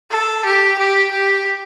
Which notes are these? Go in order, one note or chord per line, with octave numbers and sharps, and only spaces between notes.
A4
G4
G4
G4